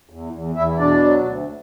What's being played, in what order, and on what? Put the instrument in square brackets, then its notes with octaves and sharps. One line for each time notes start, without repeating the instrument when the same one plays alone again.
[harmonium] E2
E2
E2 E4 E5
B2 D4 D5
F#3
D2